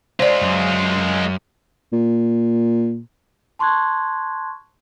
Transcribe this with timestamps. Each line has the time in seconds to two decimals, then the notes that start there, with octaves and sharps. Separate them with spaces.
0.20 G#3 F4 C5 D5
0.42 F#2
1.93 A#2
3.59 A5 C6 C#6 F#6 G#6